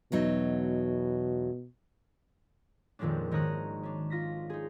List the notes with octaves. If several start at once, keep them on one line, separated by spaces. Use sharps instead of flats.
E2 B2 F#3 D#4
F2 A#2 D#3 G#3 C#4 D4
G#1 D#3 C#5 A#5 D#6 F#6
C#4 D4
F4 A#6 B6
D#4 G#4